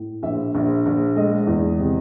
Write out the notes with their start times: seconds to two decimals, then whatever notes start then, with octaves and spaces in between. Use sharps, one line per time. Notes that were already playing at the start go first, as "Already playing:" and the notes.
Already playing: A2
0.23 A#1 E5
0.55 A#1
0.86 A#1
1.16 G#3 D#5
1.47 E2
1.79 C3